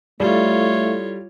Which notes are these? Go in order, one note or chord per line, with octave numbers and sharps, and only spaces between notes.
G3 A3 E4 F4 A4 C#5 F5